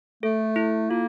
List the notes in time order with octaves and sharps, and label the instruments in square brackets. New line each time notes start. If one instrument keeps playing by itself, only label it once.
[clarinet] A3 [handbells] A4
[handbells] E4
[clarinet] A#3 [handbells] F4